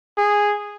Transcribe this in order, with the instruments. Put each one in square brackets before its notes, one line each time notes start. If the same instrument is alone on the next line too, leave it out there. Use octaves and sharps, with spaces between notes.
[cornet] G#4